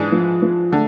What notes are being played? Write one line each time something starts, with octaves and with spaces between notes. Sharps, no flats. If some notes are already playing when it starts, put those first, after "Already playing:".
Already playing: G#2 E3 G#3 D4 G#4
F3
F3
D3 A3